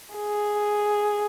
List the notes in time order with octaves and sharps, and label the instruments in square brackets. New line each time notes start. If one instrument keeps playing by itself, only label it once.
[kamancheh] G#4